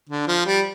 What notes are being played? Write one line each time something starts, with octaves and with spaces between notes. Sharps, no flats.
D3
F3
G3